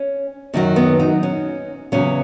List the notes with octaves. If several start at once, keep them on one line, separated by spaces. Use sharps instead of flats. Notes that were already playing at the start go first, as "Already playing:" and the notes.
Already playing: C#4
F#2 D#3 F#3 C#4
B3
D#4
C#4
E2 C#3 F#3 C#4